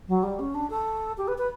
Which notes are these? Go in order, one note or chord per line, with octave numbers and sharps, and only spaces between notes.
F#3
G3
C#4
D4
A4
G4
B4
B4